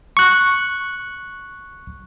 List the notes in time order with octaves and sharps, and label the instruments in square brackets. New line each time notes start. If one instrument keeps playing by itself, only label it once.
[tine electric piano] C#6 F#6